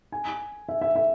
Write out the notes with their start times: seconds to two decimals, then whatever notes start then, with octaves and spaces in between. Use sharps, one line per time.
0.12 G#5
0.69 E5
0.81 E5
0.96 E5